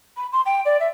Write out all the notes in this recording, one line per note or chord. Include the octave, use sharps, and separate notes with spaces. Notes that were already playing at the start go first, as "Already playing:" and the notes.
B5
C6
G5
D5
E5